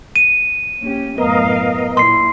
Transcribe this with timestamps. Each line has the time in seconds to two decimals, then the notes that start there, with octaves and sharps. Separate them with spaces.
0.16 D#7
0.81 A#3 C#4 G4
1.18 F#2 A2 B3 A#4 D#5 F5
1.97 A#2 E4 C6 C7